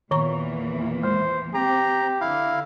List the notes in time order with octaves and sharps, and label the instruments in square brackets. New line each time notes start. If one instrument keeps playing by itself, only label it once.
[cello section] E2 A#2 E3 [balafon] D#3 A#5 C#6
[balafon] G#3 [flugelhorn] C5
[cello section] C4 [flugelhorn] G4 [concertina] A#5
[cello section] D3 [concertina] E4 F5